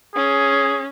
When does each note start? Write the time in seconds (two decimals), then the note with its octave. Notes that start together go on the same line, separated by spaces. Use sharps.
0.16 C#4 G#4